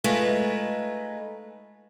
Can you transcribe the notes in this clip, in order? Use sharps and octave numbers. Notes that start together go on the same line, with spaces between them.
G#3 A3 D#4 F4 B4